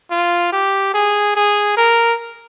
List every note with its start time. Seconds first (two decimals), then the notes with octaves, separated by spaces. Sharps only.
0.11 F4
0.53 G4
0.94 G#4
1.36 G#4
1.77 A#4